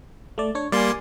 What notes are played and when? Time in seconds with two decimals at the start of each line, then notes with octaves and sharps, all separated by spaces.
0.38 A3 D5
0.55 D4 C#5
0.72 G3 A#3 D5 G#5 C6